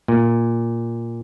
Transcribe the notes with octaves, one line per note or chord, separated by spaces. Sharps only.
A#2